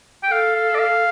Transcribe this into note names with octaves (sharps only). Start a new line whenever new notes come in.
G5
A4 F5
F5
D5
F5